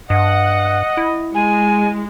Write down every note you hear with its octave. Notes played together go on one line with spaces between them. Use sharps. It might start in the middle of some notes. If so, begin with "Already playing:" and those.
G2 D#5 F#5
E4
G#3 G#5